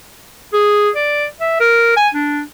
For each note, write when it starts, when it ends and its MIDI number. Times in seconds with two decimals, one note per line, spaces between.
0.53 0.90 68
0.96 1.26 74
1.40 1.56 76
1.60 1.94 70
1.97 2.08 80
2.14 2.42 62